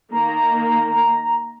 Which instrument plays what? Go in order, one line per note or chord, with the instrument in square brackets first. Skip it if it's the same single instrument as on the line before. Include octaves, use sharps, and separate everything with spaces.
[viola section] D#3 A#3 [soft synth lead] A#5